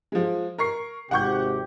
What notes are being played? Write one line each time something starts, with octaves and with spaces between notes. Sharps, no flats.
F3 G#3
A#4 C#6 C7
G#1 C3 G4 F#5 C#6 G6